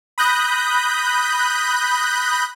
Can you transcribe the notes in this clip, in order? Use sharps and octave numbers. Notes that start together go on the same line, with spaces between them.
B5 D#6 F#6 G6 A#6